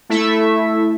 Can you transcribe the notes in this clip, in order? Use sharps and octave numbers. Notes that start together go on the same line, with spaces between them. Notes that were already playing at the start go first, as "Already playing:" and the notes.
A3 E4 A4 E5